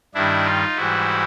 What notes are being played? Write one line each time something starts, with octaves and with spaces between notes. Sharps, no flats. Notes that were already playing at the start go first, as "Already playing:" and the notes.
G2 D#3 G3 D4 E4
D#4 F4
G#2 E3 G3 E4 F#4